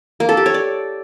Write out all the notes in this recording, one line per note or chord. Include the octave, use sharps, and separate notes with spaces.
A#3
A4
G4
C#5
D5